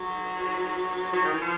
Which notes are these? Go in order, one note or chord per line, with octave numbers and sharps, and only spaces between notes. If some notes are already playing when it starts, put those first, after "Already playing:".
Already playing: F#3
F#3
D#3
E3
F3